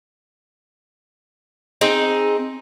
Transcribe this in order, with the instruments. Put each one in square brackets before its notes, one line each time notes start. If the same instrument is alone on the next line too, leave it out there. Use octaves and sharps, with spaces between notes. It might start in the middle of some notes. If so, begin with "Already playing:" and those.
[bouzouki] C4 D#4 G#4